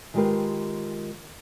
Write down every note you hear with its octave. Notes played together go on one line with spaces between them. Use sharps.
D#3 G#3 F4 G4 A#4 B4